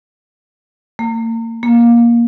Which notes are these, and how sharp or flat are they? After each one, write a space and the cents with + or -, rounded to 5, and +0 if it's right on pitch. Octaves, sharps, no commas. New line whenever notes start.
A#3 -35
A#3 +15